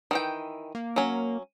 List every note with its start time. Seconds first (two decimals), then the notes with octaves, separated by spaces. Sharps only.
0.11 D#3 E3 G5
0.75 A#3
0.96 F#3 C#4